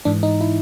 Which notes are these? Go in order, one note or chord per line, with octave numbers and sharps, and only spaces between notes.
G#2 E3 D4
D#4
E4